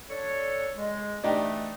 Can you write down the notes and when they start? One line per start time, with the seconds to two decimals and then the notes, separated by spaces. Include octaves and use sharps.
0.09 D4 A4 C#5
0.76 G#3
1.24 B2 E3 A3 D4 D#4 G4